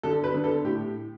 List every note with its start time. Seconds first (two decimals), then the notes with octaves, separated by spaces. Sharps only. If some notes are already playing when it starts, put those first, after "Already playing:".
0.03 D3 A4
0.24 B4
0.34 D3
0.44 A4
0.64 A2 G4